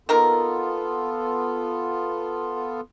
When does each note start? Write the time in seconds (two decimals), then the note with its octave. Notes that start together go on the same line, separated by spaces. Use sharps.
0.09 D#3 A#3 B3 F4 A4 A#4